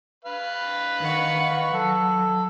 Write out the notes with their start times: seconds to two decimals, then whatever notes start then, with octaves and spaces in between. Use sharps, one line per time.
0.25 B4 F5
0.99 D#3 F#5 C#6
1.74 F#3 A4